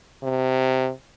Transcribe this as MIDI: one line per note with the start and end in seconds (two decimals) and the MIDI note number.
0.23 0.90 48